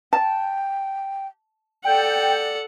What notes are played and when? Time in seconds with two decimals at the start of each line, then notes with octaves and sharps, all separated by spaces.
0.13 G5 A5
1.85 A4 D5 F#5 G5